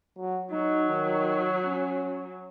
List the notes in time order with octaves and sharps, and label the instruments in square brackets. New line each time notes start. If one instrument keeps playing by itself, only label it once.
[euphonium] F#3
[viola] F#3 [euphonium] D#4
[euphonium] D#3
C#4